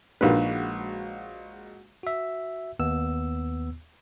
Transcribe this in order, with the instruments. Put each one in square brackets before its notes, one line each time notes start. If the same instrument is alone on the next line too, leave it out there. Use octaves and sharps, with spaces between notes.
[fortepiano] A#1 B4 [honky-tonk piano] G#3 F#4 [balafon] D4 D#4 A#4
[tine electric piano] F#4 E5
D#2 B3 E6